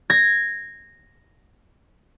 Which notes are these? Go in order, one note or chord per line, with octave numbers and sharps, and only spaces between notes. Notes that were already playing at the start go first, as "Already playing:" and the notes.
G#6 A#6